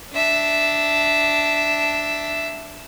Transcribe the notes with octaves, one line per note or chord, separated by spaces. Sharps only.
D4 E5